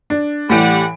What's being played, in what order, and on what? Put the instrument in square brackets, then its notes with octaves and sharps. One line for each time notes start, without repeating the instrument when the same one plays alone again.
[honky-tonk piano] D4
[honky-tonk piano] A2 E3 D7 [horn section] G3 F#5